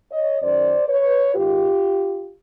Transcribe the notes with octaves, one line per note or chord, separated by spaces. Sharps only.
C#5 D#5
F#2 D#3 C5 D5
B4 C#5
G#2 D#3 F4 G4